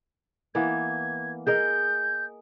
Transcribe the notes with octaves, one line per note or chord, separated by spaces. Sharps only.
E3 A#3 B3 G#6
G#4 A#4 D#5 G6